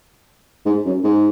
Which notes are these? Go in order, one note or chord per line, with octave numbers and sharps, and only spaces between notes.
G#2
F#2
G#2